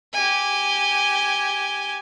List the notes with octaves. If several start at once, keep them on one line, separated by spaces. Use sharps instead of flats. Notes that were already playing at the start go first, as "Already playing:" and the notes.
G4 G#5